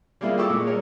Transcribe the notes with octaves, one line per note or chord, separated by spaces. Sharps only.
G3 G#3 A#3 E4 F4
F4 G4 A4 C#6 D6 E6
A#2 G#3
G3 A#4 C#5